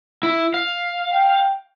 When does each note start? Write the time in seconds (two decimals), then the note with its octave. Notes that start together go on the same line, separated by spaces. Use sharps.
0.23 E4
0.54 F5
1.13 G5